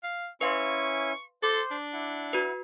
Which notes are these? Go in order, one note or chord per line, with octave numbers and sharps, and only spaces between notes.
F5
C#4 E4 B4 F5 G#5 C6 C#6
A4 C5 C6 D6
D4
E4 F#5
F#4 B4